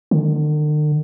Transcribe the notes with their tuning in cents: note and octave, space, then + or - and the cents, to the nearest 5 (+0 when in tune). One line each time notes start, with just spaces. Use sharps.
D3 +45